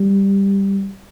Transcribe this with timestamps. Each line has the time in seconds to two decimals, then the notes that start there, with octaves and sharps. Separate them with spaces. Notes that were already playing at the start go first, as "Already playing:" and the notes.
Already playing: G3